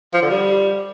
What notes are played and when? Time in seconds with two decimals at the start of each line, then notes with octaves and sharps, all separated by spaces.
0.14 F3
0.22 D3
0.30 G3